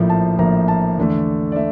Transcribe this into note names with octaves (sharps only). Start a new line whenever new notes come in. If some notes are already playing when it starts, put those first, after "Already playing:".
Already playing: A#1 A2 F3 A#3
A5
A#1 A2 F3 A#3 A#5
A5
E2 D3 A3
D5
A3 E5